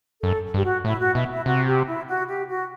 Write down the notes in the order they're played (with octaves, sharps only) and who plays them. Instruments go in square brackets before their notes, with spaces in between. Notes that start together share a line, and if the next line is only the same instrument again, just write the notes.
[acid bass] F#2 [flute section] A4
[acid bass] G2 [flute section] G4
[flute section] F#4
[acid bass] A2 [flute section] E4
[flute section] F#4
[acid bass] B2 [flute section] E4
[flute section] E4
[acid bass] C3 [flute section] F#4
[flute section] G4
E4
F#4
G4
F#4